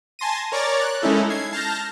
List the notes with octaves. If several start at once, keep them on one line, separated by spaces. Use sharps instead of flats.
G#5 A5 C6 A#6 D#7
A#4 C#5 D5 A#5 D6 A6
F#6
G#3 C#4 D#4 E4 A4
G#6 C7
A5 F6 G6 A#6